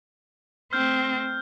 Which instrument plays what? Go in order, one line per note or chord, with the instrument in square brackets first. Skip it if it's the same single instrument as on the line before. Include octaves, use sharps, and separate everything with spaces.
[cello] A3 C4 [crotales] F6 G6